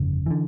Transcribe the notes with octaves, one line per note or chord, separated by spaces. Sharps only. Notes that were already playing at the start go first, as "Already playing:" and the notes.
Already playing: G1 F2 C#3
D3 E3